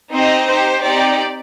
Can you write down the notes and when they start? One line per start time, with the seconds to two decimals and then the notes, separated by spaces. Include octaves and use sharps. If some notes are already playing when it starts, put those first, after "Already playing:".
0.12 C4 D#4 G4 C5 D#5
0.48 D#4 G4 C5
0.84 C4 D#4 G4 D5